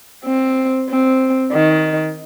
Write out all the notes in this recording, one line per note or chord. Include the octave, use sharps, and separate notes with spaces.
C4
C4
D#3